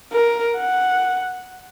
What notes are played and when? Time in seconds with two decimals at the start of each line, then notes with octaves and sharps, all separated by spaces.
0.12 A#4
0.58 F#5